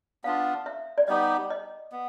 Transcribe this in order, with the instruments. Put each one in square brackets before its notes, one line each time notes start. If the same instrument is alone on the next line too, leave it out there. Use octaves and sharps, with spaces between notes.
[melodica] B3 D4 F4 [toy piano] F5
[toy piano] E5
D5
[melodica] G3 B3 D#4 G4 [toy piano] D#5
[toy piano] D#5
[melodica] B3